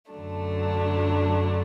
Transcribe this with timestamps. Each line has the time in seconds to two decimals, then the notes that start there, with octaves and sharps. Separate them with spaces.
0.12 F#2 D3 F#3 A3 D4